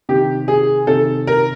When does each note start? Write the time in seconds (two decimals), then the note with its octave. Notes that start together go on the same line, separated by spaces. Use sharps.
0.09 C3 D#3 G4
0.48 G#4
0.87 C3 D#3 A4
1.27 A#4